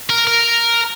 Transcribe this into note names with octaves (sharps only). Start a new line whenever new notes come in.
A#4
A#4